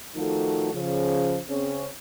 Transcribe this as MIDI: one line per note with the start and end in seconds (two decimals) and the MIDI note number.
0.15 0.68 51
0.15 0.68 53
0.15 0.68 57
0.15 0.68 63
0.15 0.68 66
0.15 0.68 69
0.72 1.38 49
0.72 1.38 53
1.48 1.86 49
1.48 1.86 60
1.48 1.86 61